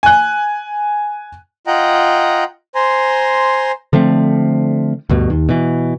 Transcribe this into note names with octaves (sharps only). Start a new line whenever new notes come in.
G#5 F#6
F4 D#5 F#5 G5 A#5
C5 G#5 A#5 C6
D3 F3 A3 C4
D2 G2 B2
D#2
B2 E3